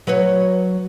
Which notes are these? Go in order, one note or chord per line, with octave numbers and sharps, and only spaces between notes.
F#3 B4 C#5